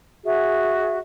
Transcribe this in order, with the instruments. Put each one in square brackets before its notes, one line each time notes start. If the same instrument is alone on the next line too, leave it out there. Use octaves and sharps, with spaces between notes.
[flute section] F#4 G#4 E5